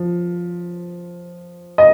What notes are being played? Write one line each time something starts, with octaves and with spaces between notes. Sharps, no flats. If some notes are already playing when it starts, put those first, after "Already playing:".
Already playing: F3
D#5